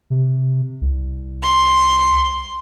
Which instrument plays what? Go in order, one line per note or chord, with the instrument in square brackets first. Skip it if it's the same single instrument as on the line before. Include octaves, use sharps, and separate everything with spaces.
[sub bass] C3
C2
[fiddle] C6